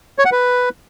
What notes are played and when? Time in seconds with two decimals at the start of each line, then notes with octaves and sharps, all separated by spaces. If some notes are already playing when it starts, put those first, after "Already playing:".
0.19 C#5
0.25 F#5
0.32 B4